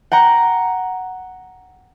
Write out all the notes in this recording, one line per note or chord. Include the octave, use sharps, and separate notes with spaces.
F#5 G5 A#5